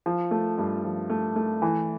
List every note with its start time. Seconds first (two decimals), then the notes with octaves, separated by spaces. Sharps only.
0.06 F3
0.31 A3
0.58 G2
0.85 F3
1.10 A3
1.36 A3
1.62 E3